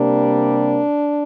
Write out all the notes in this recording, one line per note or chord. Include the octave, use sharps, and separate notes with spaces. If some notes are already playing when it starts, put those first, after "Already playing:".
Already playing: C3 G3 A#3 D4